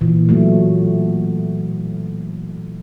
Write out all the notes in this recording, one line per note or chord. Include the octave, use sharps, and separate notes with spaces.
A#2 E3
F#3 A3